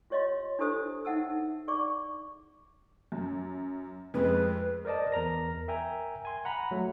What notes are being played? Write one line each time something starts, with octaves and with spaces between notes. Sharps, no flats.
F4 G4 C#5 D#5 F5 C6
D4 E4 G4 A4 C5 D#6
D#4 E5 F#5 A5 E6
G#4 D5 C#6 D6
F#2
F2 G#3 B4
A#4 C5 D5 D#5 A5
E2 A#4 A#5 A#6
A#4 E5 G5 G#5 A#5
G#5 C6
F#5 A#5 B5
F#3 A3